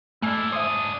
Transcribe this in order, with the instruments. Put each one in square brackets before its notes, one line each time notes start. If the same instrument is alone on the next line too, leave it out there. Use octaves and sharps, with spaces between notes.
[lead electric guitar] G#2 D4 [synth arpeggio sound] A3 F6 C7 [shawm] E4
[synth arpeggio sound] C5 E5 [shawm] D#6